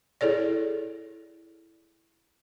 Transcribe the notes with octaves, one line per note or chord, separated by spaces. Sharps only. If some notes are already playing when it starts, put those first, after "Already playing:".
E4 G#4 A4 C#5 D5